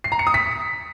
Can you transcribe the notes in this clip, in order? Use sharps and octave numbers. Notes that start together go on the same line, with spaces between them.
C7
A#5
C#7
D#6
B6